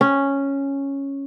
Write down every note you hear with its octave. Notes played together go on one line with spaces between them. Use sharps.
C#4